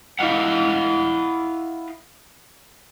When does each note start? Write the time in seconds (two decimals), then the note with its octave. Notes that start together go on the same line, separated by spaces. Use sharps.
0.19 E4 D#5 F5 F#5